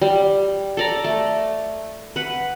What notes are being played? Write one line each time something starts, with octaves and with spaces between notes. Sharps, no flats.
G3
A4 D5 A#5
A3
B4 F#5